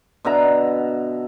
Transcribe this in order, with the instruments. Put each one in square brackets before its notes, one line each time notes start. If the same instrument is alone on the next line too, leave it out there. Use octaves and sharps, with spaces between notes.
[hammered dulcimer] B2 D3 E5 A#5